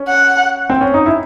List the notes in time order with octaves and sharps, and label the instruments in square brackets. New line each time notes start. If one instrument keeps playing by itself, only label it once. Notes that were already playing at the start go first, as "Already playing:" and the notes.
Already playing: [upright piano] C#4
[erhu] F#5
[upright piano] C4
C#4
D#4
E4